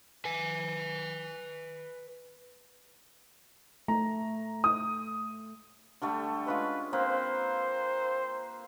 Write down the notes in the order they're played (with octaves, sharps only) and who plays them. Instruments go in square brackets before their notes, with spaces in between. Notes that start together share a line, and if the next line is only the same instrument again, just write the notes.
[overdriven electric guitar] B4 G#5
[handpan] A3 [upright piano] A#5
[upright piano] D#6
[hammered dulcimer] D3 G3 A3
[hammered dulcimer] G#3 C#4 F4 [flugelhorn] B4
[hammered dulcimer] A#3 C4 B4 [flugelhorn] C5